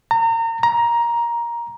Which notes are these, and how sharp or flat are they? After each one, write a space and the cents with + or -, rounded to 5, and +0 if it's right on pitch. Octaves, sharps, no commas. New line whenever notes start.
A#5 -30
A#5 +15